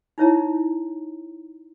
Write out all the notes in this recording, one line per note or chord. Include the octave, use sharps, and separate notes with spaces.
D#4 E4 C#5 E5 A#5